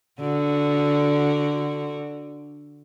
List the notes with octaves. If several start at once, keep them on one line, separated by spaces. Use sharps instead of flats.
D3 F#4